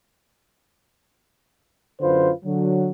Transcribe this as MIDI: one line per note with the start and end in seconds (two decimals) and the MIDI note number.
2.01 2.30 42
2.01 2.30 50
2.01 2.30 65
2.01 2.30 71
2.01 2.30 72
2.44 2.91 50
2.44 2.91 54